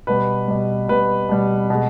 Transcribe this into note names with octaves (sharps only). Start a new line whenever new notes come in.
B2 G3 B4
B2 G3
B2 G3 B4
B2 G3
B2 G#3